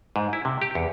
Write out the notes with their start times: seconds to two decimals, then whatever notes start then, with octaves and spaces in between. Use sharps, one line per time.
0.16 G#2
0.33 E4
0.45 C3
0.62 G4
0.75 E2